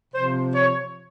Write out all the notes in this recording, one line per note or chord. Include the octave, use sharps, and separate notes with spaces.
C3 F3 C5
C#5